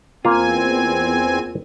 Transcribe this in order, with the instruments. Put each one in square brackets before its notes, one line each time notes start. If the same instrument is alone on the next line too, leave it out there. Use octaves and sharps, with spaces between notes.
[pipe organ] E2 C4 G#5 [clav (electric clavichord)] A#3 F4